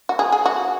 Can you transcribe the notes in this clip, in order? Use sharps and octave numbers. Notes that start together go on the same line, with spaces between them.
F#4
G#4
G#4
F#4